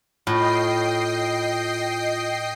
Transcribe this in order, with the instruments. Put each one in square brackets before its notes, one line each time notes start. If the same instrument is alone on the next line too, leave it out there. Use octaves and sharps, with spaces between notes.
[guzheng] A2 [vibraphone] F4 [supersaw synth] D#5 G5 C7